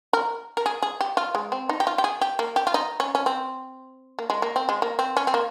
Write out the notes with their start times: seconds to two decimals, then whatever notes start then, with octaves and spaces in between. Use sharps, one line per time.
0.13 A#4
0.57 A#4
0.66 G#4
0.82 G#4
1.01 G4
1.17 F4
1.35 G#3
1.52 C4
1.69 D#4
1.80 G4
1.87 F4
1.98 G4
2.04 G#4
2.21 G4
2.39 A#3
2.56 G4
2.67 F4
2.74 D#4
3.00 C#4
3.15 C#4
3.26 C4
4.19 A#3
4.30 G#3
4.42 A#3
4.56 C4
4.69 G#3
4.82 A#3
4.99 C4
5.17 C#4
5.27 C4
5.34 A#3